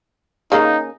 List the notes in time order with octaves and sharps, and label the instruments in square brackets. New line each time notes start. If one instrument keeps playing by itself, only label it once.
[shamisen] C#3 A#3 C#4 [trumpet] D#4